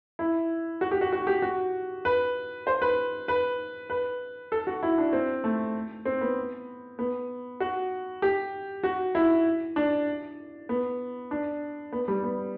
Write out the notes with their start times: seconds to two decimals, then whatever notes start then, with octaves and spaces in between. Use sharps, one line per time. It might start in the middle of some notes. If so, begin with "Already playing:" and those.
0.19 E4
0.81 F#4
0.91 G4
1.01 F#4
1.12 F#4
1.27 G4
1.42 F#4
2.05 B4
2.67 C5
2.82 B4
3.28 B4
3.90 B4
4.52 A4
4.67 F#4
4.83 E4
4.98 D4
5.13 C4
5.44 A3
6.05 C4
6.21 B3
6.99 B3
7.60 F#4
8.22 G4
8.83 F#4
9.15 E4
9.76 D4
10.69 B3
11.31 D4
11.92 B3
12.08 G3
12.24 B3